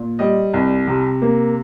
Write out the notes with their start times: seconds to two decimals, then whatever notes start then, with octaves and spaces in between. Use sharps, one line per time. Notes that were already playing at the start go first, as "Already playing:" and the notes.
Already playing: A#2
0.19 G3 D#5
0.54 C2
0.87 C3
1.22 A#3